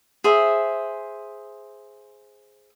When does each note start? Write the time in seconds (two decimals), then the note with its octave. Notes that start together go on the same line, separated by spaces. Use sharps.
0.24 G#4 C5 E5